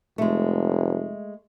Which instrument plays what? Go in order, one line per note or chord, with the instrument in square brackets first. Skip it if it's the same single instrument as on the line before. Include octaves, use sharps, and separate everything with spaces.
[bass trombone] F1 [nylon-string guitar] G#3 A3